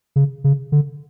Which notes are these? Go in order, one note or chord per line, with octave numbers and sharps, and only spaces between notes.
C#3
C#3
D3